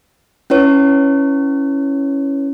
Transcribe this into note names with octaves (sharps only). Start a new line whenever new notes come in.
C#4 E4 B4 C#5